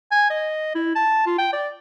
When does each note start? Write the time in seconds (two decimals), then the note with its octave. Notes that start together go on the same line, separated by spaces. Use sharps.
0.11 G#5
0.30 D#5
0.75 E4
0.96 A5
1.26 F4
1.38 G5
1.53 D5